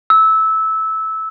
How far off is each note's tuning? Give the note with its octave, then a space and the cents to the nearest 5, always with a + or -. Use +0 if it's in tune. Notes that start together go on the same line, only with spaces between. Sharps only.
E6 -15